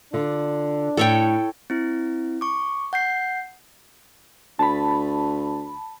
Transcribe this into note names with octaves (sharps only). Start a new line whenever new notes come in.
D3 D4 F4
A2 A4 C#5 G5
C4 E4
C#6 D6
F#5 G6 C7
D2 A5 B5